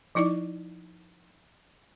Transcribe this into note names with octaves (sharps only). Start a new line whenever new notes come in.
F3 D#4 E4 D5 D6